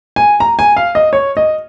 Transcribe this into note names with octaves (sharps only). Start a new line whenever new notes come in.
G#5
A#5
G#5
F5
D#5
C#5
D#5